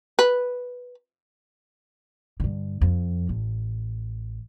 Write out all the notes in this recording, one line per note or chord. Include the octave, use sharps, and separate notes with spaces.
B4
G2 D3
F2
A1